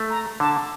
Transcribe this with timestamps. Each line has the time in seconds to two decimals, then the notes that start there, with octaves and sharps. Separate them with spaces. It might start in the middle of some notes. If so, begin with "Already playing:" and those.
Already playing: A3
0.09 A#5
0.40 D3 A5